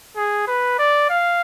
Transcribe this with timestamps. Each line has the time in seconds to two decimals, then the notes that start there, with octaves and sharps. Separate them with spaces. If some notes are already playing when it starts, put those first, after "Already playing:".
0.17 G#4
0.48 B4
0.79 D5
1.10 F5